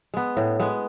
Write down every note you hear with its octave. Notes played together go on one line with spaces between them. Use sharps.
G#3 B3
A2
G#3 B3